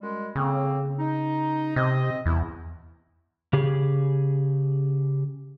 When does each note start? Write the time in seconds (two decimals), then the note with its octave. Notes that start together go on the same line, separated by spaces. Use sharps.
0.01 F#2 G3 G#3
0.36 A2 C#3 A#3 C4
0.99 D#4
1.76 C3 C4 D#5
2.26 E2 E4
3.53 C#3 G4 G#4